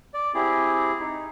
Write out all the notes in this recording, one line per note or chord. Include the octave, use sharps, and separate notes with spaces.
D5
C4 E4 G4 G#4
D#4